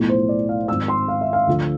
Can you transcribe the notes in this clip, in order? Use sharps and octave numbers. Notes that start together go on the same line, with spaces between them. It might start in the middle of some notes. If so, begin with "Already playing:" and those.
Already playing: B1 A2 F3
C5
D5
F5
G#1 G#2 F3 E6
C6
F5
E5
F5
D2 D3 F3